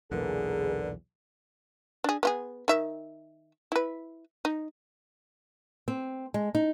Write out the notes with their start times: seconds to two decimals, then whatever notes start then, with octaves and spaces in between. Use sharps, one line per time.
0.11 B1 E2 A#2 D3 G#4 A#4 B4 D5
2.04 D4 G#4
2.23 B3 F4 G#4
2.68 D#3 E5
3.72 E4 B4
4.45 D#4
5.88 C4
6.34 G#3
6.55 D#4